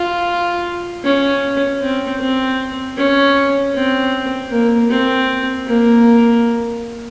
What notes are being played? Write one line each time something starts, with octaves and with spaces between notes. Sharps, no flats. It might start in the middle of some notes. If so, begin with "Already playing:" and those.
Already playing: F4
C#4
C4
C4
C#4
C4
A#3
C4
A#3